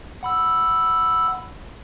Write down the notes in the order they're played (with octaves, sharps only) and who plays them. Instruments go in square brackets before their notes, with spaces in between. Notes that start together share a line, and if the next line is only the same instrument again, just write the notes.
[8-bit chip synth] F#5 B5 E6